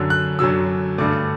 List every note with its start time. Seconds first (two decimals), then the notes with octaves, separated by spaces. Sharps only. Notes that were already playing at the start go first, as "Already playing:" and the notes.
Already playing: F#2 D3 F#3
0.10 F#6
0.39 F#2 D3 F#3 E6
0.98 G2 D3 A3 D6